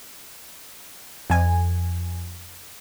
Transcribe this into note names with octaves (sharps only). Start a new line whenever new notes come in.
F2 G#5